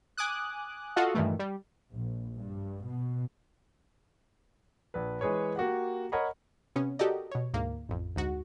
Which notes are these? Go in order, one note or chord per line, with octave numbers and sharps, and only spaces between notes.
G#5 D6 D#6 F#6
F4 F#4 A4 D#5 F5 F#5
G2 A#2 D#3 E3 A3
G3
A#1
G2
B2
A#1 B4
E3 G#3 G#4 B4 C#5
A#3 F#4 G4 F#5
A#4 C#5 D#5 F#5 B5
C3 B3 C#4
F#4 G4 A4 A#4 D5 D#5
B2 C#5
D2 G#2 A#3
A1 F2
D2 G#2 F#4